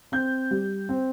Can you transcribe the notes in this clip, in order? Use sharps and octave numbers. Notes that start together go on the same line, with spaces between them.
C4 G6
G3
C4